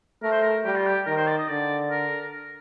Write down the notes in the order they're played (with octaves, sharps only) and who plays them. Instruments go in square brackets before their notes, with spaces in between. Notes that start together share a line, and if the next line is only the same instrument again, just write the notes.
[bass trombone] A3 [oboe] A#4
[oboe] C5
A#4
[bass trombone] G3 [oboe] G4
[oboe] F4
G4
[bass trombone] D#3 [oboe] A#4
[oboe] C5
D5
D#5
[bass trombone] D3 [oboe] D5
[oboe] A#4